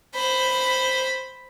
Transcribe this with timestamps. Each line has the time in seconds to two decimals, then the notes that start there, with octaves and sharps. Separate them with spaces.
0.15 C5 B5